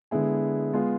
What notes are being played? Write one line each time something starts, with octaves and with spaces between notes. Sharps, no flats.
D3 G#3 B3 E4 G#4
G#3 B3 F4 G#4